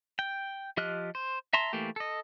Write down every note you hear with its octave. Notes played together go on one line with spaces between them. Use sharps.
G5
F3 G4 D#5 F6 F#6
C5
E5 A5 A#5 C6
E3 A3 A#3 G4
A4 D#5